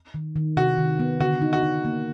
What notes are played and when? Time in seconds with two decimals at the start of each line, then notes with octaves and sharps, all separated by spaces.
0.14 D#3
0.36 D#3
0.57 C3 F#4
0.78 D#3
0.99 B3
1.20 D3 F#4
1.42 D#4
1.53 F#4
1.63 D#4
1.85 A#3